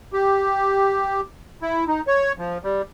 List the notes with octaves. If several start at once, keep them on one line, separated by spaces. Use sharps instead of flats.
G4
E4
D#4
C#5
F3
G3